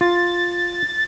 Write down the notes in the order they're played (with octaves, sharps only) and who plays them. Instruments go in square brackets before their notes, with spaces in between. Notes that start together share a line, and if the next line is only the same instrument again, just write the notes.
[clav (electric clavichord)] F4 [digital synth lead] A6